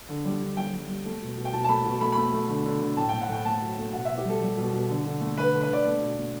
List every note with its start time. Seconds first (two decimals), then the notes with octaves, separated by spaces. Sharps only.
0.09 D3
0.25 G3
0.42 D3
0.57 G3 G5
0.73 G3
0.89 G3
1.05 A3
1.22 B2
1.37 B2
1.45 G5
1.53 B2 A5
1.64 A5
1.69 A3 B5
1.85 B2
2.01 A3 B5
2.12 A3 B5
2.33 A3
2.49 D3
2.66 D3
2.82 D3
2.97 A2 A5
3.09 A2 G5
3.21 F#5
3.29 A2 G5
3.45 A3 A5
3.61 F#3
3.77 A3
3.93 B2 F#5
4.05 B2 E5
4.17 G4
4.25 G3 A4
4.41 G3
4.57 B2
4.72 B2
4.89 D3
5.05 D3
5.21 A3
5.37 D3 B4
5.53 D3
5.61 B4
5.69 D3 D5
5.85 A3
6.00 B2
6.17 A3